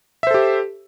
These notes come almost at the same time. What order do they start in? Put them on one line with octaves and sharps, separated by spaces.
E5 C5 A4 G4